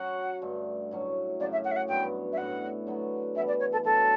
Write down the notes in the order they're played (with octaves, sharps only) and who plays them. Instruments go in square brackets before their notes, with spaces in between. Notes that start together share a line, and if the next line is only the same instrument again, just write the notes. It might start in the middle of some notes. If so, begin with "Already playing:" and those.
Already playing: [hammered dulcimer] F#3 C#4 F#4 [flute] F#5
[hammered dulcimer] G2 D3 A3
A2 F#3 C#4
[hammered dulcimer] F#2 C#3 F#3 C#4 [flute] D5
[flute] E5
F#5
E5
F#5
[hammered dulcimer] G2 F#3 B3 [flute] G5
[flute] E5
[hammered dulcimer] A2 G3 B3 [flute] F#5
[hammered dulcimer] D3 F#3 B3
[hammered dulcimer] E3 G3 B3 [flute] E5
[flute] D5
C#5
A4
[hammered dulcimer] G2 F#3 A3 [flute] A4